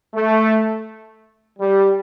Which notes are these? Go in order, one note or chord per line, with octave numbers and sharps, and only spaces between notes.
A3
G3